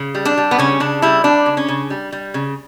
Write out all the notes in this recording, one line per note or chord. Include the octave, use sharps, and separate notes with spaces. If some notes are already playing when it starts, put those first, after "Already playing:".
Already playing: C#3
G3
D4
G3
B3
C#3 C#4
C#3 D4
G3 E4
G3 D4
C#3
C#4
C#3
G3
G3
C#3